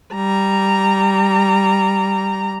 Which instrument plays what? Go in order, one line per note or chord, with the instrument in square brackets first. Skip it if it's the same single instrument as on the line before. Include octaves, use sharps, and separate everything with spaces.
[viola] G3 A#5